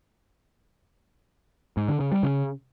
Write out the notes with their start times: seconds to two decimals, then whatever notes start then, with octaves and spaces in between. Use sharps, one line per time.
1.77 G#2
1.88 D3
2.00 C#3
2.12 G3
2.23 C#3